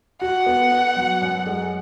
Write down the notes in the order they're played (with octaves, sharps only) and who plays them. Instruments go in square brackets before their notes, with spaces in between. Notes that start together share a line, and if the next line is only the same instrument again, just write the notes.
[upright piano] F#4 [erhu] F#5
[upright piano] B3
B3
F#3
F#2
G#3